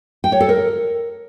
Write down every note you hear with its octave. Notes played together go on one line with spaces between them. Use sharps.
G5
C#5
A4
A#4